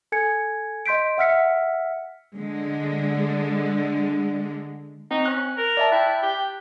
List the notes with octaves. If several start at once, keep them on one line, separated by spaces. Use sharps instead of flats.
A4 G#5 G#6 C#7
D#5 C6 G6 B6 D7
E5 F#5 E6 F6 B6 C#7
D3 G#3
C4 D#4
C#4 F#6
A#4
D5 E5 A5
E4 G5 F#6
G4